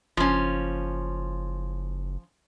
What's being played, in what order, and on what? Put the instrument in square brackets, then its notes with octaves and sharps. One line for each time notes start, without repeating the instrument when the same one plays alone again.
[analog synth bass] F#1 [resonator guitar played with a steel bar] F3 C#4